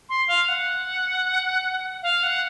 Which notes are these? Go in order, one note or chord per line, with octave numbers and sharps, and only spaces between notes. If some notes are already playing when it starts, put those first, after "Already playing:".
C6
F5
F#5
F5
F#5